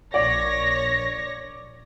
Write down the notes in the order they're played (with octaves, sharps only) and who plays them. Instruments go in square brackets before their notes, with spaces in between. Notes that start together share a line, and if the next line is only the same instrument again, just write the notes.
[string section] A#1 C#5 A#6 [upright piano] D5